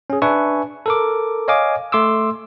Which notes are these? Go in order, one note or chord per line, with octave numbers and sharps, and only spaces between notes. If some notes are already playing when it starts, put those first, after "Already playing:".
C#4 G#4
D4 B4 E5 G#5 C#6
A4 A#4 D6
C#5 D#5 F5 G#5 D6
A3 C6 D6 E6